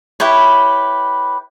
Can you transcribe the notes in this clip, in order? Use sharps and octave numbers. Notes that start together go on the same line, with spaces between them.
E4 G4 B4 C#5